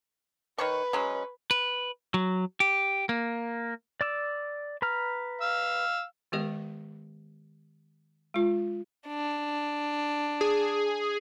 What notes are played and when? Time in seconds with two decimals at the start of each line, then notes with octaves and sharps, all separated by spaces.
0.58 D#3 B4 C#5 C#6
0.93 F#3 G#3 C#4
1.51 B4
2.14 F#3
2.60 G4
3.09 A#3
4.01 D5 D6 E6
4.82 B4 A#5 F6
5.41 F5 E6
6.32 D#3 G#3 B3 G4 A#4 D#5
8.34 G#3 F4
9.08 D4
10.41 G#4